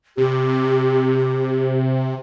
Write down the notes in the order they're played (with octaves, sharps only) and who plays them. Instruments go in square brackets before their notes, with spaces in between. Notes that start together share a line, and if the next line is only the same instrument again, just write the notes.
[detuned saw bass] C3 [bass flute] G4